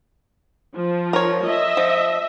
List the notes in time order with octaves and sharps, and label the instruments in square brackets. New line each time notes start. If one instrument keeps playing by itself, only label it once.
[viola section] F3
[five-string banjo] A#4 C#5
[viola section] D#5 E5
[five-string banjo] F3